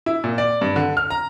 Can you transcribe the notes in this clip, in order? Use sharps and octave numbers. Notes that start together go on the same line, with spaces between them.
E4
A#2
D5
G2
D3
F6
A#5